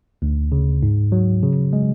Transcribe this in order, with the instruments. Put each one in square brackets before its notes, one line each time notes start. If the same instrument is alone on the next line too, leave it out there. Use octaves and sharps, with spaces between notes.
[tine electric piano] D2
C#3
G#2
F#3
C#3
G#3